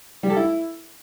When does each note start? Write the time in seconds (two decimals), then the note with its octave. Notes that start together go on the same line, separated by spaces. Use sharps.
0.23 G3
0.30 A4
0.36 E4